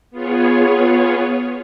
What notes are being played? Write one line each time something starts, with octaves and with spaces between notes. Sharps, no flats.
B3 F4 G#4 C#5